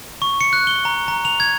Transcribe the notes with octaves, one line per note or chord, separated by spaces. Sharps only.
C#6
C#7
F#6
G7
A#5
A#5
F7
G#6